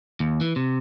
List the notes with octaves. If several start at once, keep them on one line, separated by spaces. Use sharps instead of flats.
D#2
E3
C3